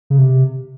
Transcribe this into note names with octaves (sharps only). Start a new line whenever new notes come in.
C#3
C3